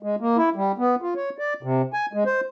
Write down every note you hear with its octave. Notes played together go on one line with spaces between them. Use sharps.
G#3
A#3
E4
G3
B3
F4
C#5
D5
C3
G#5
G#3
C5